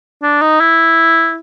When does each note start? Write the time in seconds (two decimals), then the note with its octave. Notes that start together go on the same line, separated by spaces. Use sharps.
0.23 D4
0.41 D#4
0.60 E4